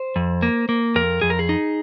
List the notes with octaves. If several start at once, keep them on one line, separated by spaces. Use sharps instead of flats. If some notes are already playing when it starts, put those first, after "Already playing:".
Already playing: C5
F2
A#3
A#3
F2 A#4
F2 G#4
A#4
G#4
D#4